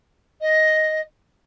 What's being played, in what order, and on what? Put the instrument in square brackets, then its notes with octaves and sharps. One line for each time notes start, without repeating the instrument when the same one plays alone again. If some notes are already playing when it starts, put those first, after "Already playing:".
[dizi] D#5